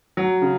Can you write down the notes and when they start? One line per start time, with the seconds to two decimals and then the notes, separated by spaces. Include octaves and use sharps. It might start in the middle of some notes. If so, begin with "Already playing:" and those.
0.17 F#3
0.42 C#3